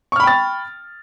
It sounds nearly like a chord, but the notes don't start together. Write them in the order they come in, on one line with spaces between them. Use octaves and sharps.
C#6 F6 B5 G5 A6